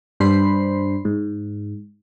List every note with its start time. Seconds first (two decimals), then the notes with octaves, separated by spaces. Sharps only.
0.20 G2 D4 C5 B5 C7
1.05 G#2